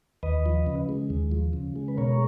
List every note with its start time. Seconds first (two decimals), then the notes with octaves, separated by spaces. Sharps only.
0.23 D#2 B4 D#5
0.46 F3
0.66 C#3
0.89 G#3
1.10 D#2
1.32 F3
1.53 C#3
1.76 G#3
1.88 B4
1.97 B2 A#4 C#5